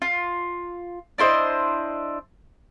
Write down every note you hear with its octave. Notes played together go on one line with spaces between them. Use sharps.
F4
D4 E4 C5 D#5